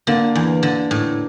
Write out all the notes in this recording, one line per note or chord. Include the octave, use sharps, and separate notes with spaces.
D3 A#3
E2
D3
A2